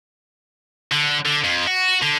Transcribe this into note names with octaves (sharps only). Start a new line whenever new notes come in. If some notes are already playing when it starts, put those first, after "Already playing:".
D3
D3
F2
F#4
D3